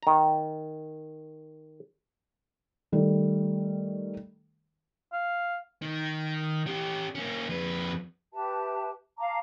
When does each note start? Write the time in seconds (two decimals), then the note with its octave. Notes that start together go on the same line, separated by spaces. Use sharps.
0.03 D#3 A#5
2.92 D#3 G3 A3
5.13 F5
5.82 D#3
6.67 C#4 G4
7.15 A#3 C#4
7.49 F2 B4
8.33 G4 B4 E5 A5
9.18 F5 A5 A#5 D6